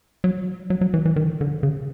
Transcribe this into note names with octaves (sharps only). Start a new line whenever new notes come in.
F#3
F#3
F#3
E3
E3
D#3
D3
C#3